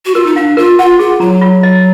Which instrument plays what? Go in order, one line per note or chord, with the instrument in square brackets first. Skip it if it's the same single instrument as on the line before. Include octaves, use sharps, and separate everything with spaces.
[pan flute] F#4
[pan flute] F4 [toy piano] A#4
[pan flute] D#4
[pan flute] D4 [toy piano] F5
[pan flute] F4 [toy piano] A#4
[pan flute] F4 [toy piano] F#5
[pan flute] F4 [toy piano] G#4
[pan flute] F#3 [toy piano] A#5
[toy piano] F4
D#5